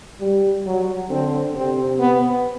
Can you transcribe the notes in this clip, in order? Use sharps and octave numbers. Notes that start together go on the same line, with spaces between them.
G3
F#3
D3 C4
C3 C4
B3